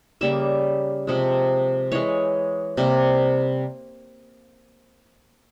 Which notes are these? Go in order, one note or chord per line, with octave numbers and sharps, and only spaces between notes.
C#3 G3 A#3 E5
C3 F3 G#3
E3 G#3 C#5
C3 G3 A#3